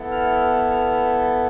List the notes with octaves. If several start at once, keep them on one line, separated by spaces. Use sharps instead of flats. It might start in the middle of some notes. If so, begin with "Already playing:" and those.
Already playing: B3 E4 A4
F6